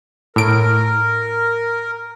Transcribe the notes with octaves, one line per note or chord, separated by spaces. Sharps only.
A2 A#4 D7